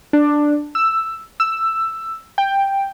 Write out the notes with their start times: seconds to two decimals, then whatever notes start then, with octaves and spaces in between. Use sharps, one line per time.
0.13 D4
0.75 E6
1.40 E6
2.38 G5